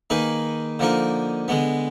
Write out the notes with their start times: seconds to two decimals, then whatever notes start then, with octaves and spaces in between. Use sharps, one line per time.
0.10 D#3 A#3 D#4 G#4 B4
0.79 D3 F3 A#3 D#4 A#4
1.48 D3 G#3 B3